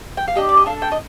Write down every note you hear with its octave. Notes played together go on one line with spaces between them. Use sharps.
G5
F5
D4 G4 D#5
D5
D#5
D4 A4 F5
G5
D#5